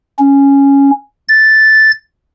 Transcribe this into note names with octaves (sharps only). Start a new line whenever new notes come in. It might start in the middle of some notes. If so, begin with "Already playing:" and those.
C#4
A6